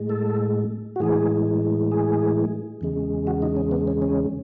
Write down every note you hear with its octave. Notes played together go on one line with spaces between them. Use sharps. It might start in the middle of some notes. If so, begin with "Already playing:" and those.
Already playing: A2 G#3
A4
F#4
A2 E3 G#3 G#4
G#4
E2 C#3 G#3
F#4
D#4
C#4
B3
C#4
C#4